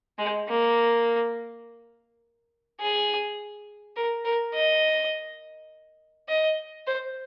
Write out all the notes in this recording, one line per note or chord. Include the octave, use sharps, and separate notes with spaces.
G#3
A#3
G#4
A#4
A#4
D#5
D#5
C5